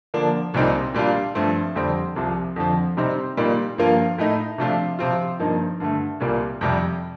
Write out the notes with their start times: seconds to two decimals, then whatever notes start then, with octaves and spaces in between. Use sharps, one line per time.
0.14 D3 F3 A#3 D4
0.54 C2 A#2 G3 C4 D#4
0.94 A#2 G3 D4 F4
1.35 G2 F3 A3 C4
1.75 F2 D3 G3 C4
2.16 C2 C3 F3
2.56 F2 D3 F3
2.97 C3 G3 C4 D#4
3.37 A#2 G3 A#3 D#4
3.78 G2 F3 A#3 F4
4.18 A2 A3 D#4
4.58 C3 F3 A3 D4 F4
4.99 C3 F3 C4 F4
5.40 G2 F3 A#3 D#4
5.80 G2 D3 A3
6.20 C2 A#2 G3 A#3
6.61 F2 C3 G3